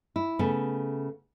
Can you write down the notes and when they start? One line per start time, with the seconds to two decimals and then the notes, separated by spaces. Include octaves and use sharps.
0.16 E4
0.39 C#3 A3 B3